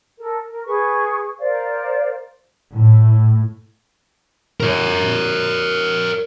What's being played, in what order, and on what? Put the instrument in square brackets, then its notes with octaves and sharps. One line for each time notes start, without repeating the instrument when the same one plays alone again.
[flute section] A4 A#4
A#4
G#4 B4 C#6
A#4 C5 D5 F5
[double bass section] A2
[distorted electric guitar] A#4 C#5